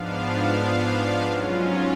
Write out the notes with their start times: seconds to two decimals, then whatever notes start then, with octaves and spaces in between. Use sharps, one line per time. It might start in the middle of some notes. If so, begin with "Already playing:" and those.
Already playing: G#2 F3 B3 D4 F5
0.20 F5
0.89 F5
1.24 G#2 F#3 C#4 F4